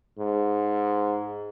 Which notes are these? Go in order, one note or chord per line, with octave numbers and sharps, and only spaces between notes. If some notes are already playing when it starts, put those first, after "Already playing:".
G#2